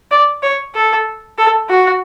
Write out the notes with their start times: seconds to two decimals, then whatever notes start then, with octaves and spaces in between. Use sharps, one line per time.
0.11 D5
0.43 C#5
0.75 A4
1.38 A4
1.69 F#4